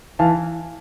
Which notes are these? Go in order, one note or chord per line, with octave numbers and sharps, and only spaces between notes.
E3 F5 A5